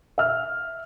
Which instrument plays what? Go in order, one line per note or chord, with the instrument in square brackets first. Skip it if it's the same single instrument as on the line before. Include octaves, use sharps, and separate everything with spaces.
[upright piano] E5 F6